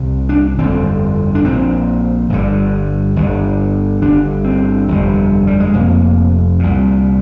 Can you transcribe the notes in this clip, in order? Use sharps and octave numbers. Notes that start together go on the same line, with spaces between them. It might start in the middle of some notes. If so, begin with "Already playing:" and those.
Already playing: C2 C3
D4
G1 F2 D3 C4
D4
A#1 A#2 C4
G1 G2 D3
G1 G2 D3
G1 G2 D3 D4
C4
G1 F2 C3
G3
G#3
F1 F2 C3 A#3
C2 A#2